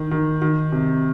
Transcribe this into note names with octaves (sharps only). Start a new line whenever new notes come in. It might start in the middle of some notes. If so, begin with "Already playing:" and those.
Already playing: D#3
D#3
D#3
C3